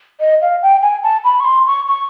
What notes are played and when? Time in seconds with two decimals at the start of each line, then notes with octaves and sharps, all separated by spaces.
0.20 D#5
0.42 F5
0.62 G5
0.83 G#5
1.03 A5
1.24 B5
1.40 C#6
1.45 C6
1.67 C#6
1.87 C#6